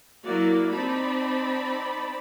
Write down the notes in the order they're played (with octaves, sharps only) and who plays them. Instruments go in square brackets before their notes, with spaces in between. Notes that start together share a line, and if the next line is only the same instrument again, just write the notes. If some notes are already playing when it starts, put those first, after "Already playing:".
[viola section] F#3 A#3 E4 F#4 D5
C4 D#4 D5 A5 B5